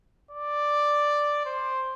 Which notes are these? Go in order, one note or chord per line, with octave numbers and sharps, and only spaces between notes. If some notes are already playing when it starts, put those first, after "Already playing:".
D5
C5